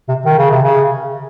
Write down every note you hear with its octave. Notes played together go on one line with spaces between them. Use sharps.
C3
D#3
C#3
C3
C#3